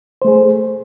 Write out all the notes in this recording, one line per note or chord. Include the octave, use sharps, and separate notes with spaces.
A3 G#4 C5